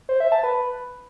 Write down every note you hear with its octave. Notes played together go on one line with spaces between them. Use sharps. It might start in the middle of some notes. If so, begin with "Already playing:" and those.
C5
E5
A5
B4